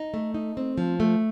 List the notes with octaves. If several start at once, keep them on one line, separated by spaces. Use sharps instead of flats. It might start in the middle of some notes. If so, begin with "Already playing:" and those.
Already playing: D#4
A3
D#4
C4
F3
A3